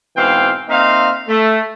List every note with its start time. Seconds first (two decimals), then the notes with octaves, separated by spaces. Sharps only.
0.17 G#2 B2 E3 C4 F5 G5
0.69 A#3 C4 D#4 E5 F5
1.28 A3